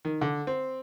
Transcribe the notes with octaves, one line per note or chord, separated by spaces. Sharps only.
D#3
D3
C4